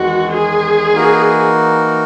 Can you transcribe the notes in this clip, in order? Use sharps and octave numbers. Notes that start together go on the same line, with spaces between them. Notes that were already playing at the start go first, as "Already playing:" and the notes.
Already playing: E2 D#3 G#3 F#4
G#4
E3 A#3 D#4 F#4 A#4